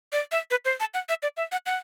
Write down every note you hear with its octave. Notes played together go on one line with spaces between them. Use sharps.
D5
E5
B4
C5
A5
F#5
E5
D5
E5
F#5
F#5